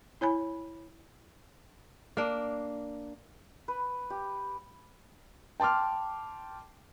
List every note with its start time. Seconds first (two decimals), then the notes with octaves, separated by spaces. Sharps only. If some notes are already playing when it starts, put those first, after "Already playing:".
0.21 E4 C#5 G#5 B5
2.17 A#3 D4
3.68 B4
4.10 G4
5.60 G5 A5 C6 D6 F6